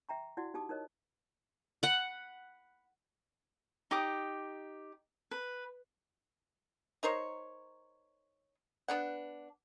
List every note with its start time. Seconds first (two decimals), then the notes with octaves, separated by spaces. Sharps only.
0.09 E5 G5 A#5 C#6
0.37 E4 F#4 D5 F#5
0.54 D#4 G4 A5 D6 D#6
0.69 D#4 A#4 C#5 D#5
1.83 F#5 B5
3.91 D#4 G4 D6 D#6
5.31 B4
7.03 D#4 A#4 C5 C#5
8.88 B3 D4 F#5